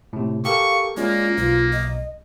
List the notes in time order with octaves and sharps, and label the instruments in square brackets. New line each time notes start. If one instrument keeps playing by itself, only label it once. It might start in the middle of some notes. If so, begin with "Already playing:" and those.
[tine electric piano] A2 C3
[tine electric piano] G4 A4 A#4 [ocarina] F5 [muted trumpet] C#6
[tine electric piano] G#3 C#4 D5 [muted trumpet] A#3 [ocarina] F4
[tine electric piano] B1 [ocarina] F4
[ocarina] D#5